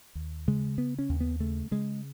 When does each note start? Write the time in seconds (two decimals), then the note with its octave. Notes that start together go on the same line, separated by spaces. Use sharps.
0.15 D#2
0.48 C#3 G#3
0.78 C#3 B3
0.99 C#4
1.09 D#2
1.21 B3
1.40 C#3 A3
1.71 C#3 G#3